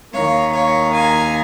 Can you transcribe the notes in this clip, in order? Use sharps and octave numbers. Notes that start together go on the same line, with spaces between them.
D#2 D#3 A#3 C#5 F5
C#5 F5
F5 G#5